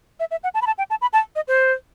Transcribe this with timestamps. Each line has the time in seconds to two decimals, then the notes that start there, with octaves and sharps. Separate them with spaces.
0.20 E5
0.31 E5
0.44 F#5
0.54 A5
0.62 B5
0.67 A5
0.78 G5
0.90 A5
1.02 B5
1.13 A5
1.36 D#5
1.48 C5